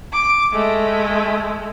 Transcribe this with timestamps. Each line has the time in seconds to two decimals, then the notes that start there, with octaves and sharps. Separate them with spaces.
0.13 D6
0.53 G#3 A3